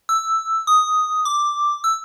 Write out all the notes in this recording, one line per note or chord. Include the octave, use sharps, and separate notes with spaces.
E6
D#6
D6
E6